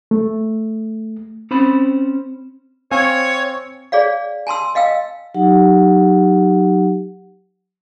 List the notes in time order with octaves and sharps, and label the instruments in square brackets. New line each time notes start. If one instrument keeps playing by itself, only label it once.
[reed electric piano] A3
[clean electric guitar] C4 C#4 C5 B5
[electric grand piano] C4 F5 G#5 [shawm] C#5
[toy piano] G#4 C#5 D5 F5
G#5 A5 C6 E6
D#5 F5 G5 E6
[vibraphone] F#3 D#4 G4 F#5